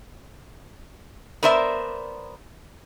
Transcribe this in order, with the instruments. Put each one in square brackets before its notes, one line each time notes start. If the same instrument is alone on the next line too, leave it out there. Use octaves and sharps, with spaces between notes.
[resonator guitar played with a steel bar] B3 A#4 C5 D5 E5